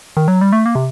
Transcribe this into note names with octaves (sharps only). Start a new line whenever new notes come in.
D#3
F#3
G3
A3
A#3
C3